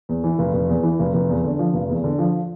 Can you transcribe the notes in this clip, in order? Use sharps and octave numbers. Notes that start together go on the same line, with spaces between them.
E2
E3
F1
F1
E2
E3
F1
F1
E2
D3
F3
F1
E2
D3
F3